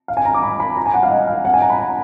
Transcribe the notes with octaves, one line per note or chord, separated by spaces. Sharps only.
F5
G#5
A#5
D6
B5
B5
A#5
G#5
F#5
F5
D#5
F5
F#5
G#5
A#5
B5
A#5